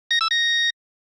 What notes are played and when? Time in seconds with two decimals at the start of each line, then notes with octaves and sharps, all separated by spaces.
0.11 A#6
0.21 E6
0.31 A#6